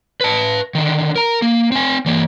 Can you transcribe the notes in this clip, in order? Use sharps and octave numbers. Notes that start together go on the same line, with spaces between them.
B4 A5
D3 D#3
A#4 A#5
A#3
C4 G#5
E3 A#3